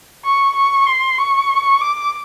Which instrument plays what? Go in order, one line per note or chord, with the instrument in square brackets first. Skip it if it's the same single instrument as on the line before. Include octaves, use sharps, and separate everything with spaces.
[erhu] C#6
C#6
C6
C#6
D6